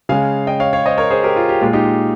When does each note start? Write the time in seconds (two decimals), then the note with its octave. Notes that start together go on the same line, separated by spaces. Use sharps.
0.09 C#3 G#3 F5 G#5
0.47 D#5 G5
0.60 C#5 F5
0.73 C#5 F5
0.85 C5 D#5
0.98 A#4 C#5
1.10 G#4 C5
1.23 G4 A#4
1.36 F4
1.49 G4
1.61 A#2 G#3 F4
1.73 D#4 G4